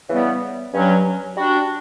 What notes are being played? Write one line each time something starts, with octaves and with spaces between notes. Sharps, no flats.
C#3 E3 G3 B3
G2 F#3 C#4
G3 D4 F#4